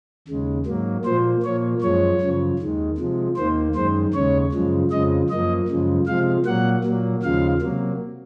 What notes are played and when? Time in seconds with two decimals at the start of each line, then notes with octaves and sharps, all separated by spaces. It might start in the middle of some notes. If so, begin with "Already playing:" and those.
0.28 D#2 C#3 G#3
0.66 G#2 F#3 A#3
1.05 A#2 F3 A#3 C5
1.43 A#2 F3 A#3 C#5
1.82 F#2 F3 G#3 C#5
2.21 F#2 C#3 F3
2.59 D#2 D#3 G#3
2.98 C3 F3 G#3
3.36 D#2 D#3 A#3 C5
3.75 F#2 D#3 G#3 C5
4.14 D#2 C#3 G#3 C#5
4.53 F#2 C#3 F3 G#3
4.91 F2 C#3 F3 G#3 D#5
5.30 F#2 F3 A#3 D#5
5.68 F#2 C#3 F3 G#3
6.07 C3 F3 G#3 F5
6.46 A#2 F#3 A#3 F#5
6.84 A#2 F#3 A#3
7.23 D#2 C#3 F3 G#3 F5
7.62 C3 F#3 A#3